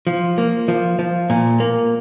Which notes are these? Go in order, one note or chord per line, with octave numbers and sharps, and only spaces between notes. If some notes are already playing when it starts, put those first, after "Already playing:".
F3
A#3
F3
F3
A#2
A#3